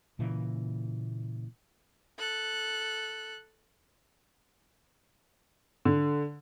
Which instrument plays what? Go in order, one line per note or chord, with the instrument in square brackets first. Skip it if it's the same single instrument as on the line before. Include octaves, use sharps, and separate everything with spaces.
[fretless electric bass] A#2 C#3 E3 A#3
[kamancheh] A4 F#6
[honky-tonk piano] D3